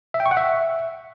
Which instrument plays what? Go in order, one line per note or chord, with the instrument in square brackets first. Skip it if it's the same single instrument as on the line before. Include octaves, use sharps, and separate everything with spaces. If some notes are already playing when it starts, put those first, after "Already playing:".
[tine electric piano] E5
G5
C#6
F#5
E5